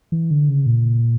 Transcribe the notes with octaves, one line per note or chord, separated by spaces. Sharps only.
E3
D3
C#3
A#2